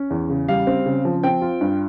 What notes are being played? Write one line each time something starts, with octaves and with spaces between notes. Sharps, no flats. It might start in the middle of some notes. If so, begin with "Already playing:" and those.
Already playing: C#4
E2
C#3
G3 F5
C4
C#3
F3
C4 G5
F4
G2